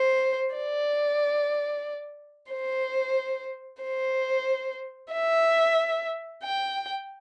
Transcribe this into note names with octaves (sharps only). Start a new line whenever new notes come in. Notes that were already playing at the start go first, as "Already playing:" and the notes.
Already playing: C5
D5
C5
C5
E5
G5